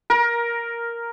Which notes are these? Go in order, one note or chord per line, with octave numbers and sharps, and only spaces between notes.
A#4